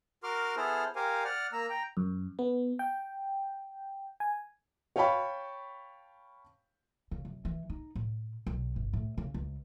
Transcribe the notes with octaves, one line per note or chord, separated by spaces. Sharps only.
F#4 A#4 C6 D6 F6
B3 E4 G#4 A4 C5 F6
G4 A#4 C5 F5 G#5
D5 F#5 F6
A#3 A#5 E6
G5 A#5
F#2
B3
G5
G#5
C#5 F5 G5 A5 B5 C#6
C#3
F#2
E3
D#4
A2
B1
G1
A2
C#3
C#2